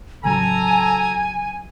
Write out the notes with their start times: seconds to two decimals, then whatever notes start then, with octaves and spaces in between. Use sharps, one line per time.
0.24 A1 C#3 F#3 A4 G#5 A#5